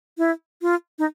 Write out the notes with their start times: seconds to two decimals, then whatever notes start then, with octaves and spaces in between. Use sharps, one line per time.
0.18 E4
0.62 F4
0.99 D#4